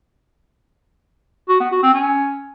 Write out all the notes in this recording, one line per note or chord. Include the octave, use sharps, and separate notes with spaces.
F#4
B3
F#4
C4
C#4